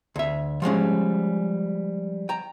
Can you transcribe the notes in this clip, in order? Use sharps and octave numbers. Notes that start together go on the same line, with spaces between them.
D2 E5
F3 G3 G#3 C#4
G5 A#5